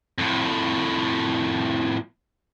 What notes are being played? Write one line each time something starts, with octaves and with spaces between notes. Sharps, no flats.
F2 A2